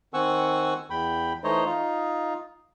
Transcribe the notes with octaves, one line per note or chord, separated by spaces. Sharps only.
D#3 C4 F#5 G#5 C#6 E6
E2 G5 B5
E3 A3 D#4 C5 C#5 D#5
D#4 F4